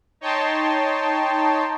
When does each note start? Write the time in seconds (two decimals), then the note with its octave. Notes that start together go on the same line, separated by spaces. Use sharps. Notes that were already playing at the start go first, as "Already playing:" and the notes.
0.21 D#4 C#5 D#5 G5 A5 C6